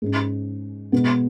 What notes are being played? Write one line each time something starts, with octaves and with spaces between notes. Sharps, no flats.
G#2 G#3 C#4
B2 G#3 B3